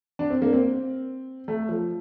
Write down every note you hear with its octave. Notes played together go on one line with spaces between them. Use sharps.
D4
C4
A#3
C4
A3
F3